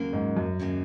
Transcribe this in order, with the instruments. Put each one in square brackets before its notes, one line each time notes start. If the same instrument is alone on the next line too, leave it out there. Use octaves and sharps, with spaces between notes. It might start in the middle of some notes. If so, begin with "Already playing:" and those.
Already playing: [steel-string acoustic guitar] D#2 C#3 F#3 A#3
[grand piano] G#2
F#2
[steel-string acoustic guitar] D#2 C#3 F#3 A#3